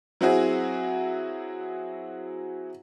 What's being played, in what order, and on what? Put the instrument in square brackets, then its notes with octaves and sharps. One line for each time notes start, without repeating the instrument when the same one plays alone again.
[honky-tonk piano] F#3 C4 E4 F#4 G#4